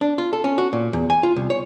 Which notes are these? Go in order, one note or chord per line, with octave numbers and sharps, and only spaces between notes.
D4
F4
A4
C#4
F#4
A#2
E2
G#5
F4
C2
C#5